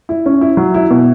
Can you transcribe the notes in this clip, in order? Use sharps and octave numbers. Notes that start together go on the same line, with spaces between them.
E4
C#4
E4
F#3
E4
B2